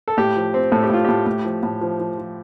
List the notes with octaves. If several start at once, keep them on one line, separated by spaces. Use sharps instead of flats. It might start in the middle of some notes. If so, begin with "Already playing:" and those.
A4
A2 G4
F3
C4
A2 A4
G4
A2 F4
A2 G4
A2
F3
A2
F3
F3
F3